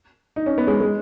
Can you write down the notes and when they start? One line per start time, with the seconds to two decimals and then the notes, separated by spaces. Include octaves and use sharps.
0.36 D#4
0.46 C#4
0.58 B3
0.67 G#3 C#4
0.81 G#3